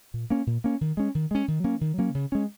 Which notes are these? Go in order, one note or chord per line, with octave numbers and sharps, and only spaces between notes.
A#2
A#3 C#4
A#2
A#3 C#4
D#3
G#3 C#4
D#3
G#3 C#4
D#3
F#3 A#3 C#4
D#3
F#3 A#3 C#4
C#3
G#3 C#4